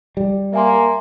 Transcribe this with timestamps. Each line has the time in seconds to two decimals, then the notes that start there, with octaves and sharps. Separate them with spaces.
0.17 G3
0.53 A#3 E5 G#5 C6